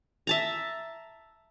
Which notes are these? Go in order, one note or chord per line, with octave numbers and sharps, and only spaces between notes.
E5 A5 A#5